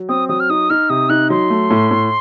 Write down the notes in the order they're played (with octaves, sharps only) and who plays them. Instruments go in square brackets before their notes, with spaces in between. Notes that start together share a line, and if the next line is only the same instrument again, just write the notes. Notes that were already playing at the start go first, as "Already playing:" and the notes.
Already playing: [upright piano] F#3
[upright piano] C4 [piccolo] D#6
[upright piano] F#3 [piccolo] D#6
[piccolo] F6
[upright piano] D#4 [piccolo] D#6
[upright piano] D#4 [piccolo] F6
[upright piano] C3 [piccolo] D#6
[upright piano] D#4 [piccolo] F#6
[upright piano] F#3 [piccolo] C6
[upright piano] A3
A2
A2